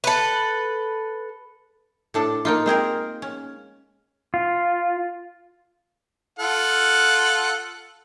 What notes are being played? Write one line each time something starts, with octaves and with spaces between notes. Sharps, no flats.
A4 B4
A2 D4 A4
A#3 D#4 F4
G#3 C4 G#4 A#4
C#4
F4
F4 A4 F#5